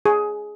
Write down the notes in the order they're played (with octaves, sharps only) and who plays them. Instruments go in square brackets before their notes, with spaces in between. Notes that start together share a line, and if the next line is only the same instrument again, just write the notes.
[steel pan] G#4